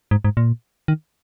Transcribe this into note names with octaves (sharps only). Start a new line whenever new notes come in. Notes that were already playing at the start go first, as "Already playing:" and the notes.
G#2
G#2
A#2
D#3